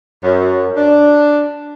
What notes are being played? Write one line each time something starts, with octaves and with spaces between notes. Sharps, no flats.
F#2
D4